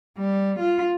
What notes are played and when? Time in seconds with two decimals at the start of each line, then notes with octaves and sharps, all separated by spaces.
0.18 G3
0.59 F4